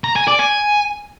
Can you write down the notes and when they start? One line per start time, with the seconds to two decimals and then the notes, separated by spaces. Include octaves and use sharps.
0.04 A#5
0.16 G#5
0.27 D5
0.39 G#5